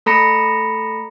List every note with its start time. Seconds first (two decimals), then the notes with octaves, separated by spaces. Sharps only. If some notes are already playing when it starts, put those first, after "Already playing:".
0.06 A3 A4 A#5 B5 A#6 C#7